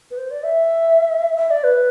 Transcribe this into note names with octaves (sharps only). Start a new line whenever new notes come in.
B4
C5
D5
E5
E5
D5
B4